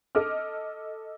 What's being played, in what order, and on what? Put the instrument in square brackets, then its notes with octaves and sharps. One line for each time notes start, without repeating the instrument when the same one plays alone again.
[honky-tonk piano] A4 D#5 D6 F6